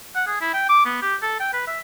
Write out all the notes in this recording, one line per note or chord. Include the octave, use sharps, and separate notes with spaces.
F#5
G#4
E4
G5
D6
B3
G4
A4
G5
B4
E5